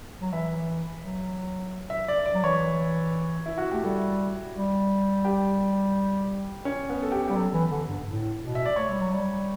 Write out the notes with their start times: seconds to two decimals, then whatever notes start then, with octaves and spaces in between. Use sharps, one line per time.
0.21 F#3
0.33 E3 E5
1.03 F#3
1.90 E5
2.08 D5
2.26 D5
2.34 F#3
2.44 E3 C#5
3.46 E4
3.58 F#4
3.72 A3 G4
3.84 G3 A4
4.55 G3
5.25 G4
6.65 C#4
6.89 B3
7.02 A4
7.12 G4
7.28 G3 G4
7.35 F#3 A4
7.53 E3
7.71 D3
7.89 G2
8.06 A2
8.41 B2
8.55 E5
8.65 D5
8.76 A3 C#5
8.89 G3
9.00 F#3
9.13 G3